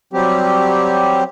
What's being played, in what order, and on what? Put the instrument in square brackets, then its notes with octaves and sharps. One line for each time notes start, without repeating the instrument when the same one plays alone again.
[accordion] F#3 G3 C4 G4